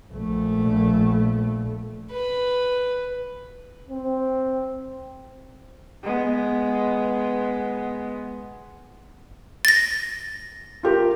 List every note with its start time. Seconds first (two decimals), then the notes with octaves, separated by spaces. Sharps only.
0.12 A#1 A3
2.12 B4
3.89 C4
6.03 G#3 B3
9.65 A6 A#6
10.83 F4 G4 A#4